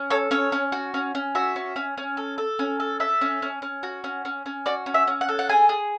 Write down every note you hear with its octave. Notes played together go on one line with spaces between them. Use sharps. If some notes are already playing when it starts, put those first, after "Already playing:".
Already playing: C#4
A4 C#5
C#4 C#5
C#4
F#4
C#4
C#4
F#4 E5
C#4
C#4
C#4
A4
A4
C#4
A4
A4 E5
C#4
C#4
C#4
F#4
C#4
C#4
C#4
F#4 D5
C#4
E5
C#4
F#5
A4
F#5
G#4 G#5
G#4